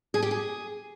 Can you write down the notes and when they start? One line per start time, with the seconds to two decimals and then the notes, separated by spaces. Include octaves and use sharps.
0.14 G#4
0.22 G4
0.31 G#4